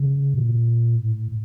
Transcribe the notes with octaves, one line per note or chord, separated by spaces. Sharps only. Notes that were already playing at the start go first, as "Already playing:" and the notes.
Already playing: C#3
A#2
A2